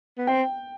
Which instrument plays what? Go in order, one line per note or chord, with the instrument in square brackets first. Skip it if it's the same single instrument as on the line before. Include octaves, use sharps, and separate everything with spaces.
[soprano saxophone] B3
[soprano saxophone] C4 [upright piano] G5